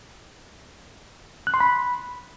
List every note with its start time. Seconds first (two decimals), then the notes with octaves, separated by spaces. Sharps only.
1.47 F#6
1.54 C6
1.60 B5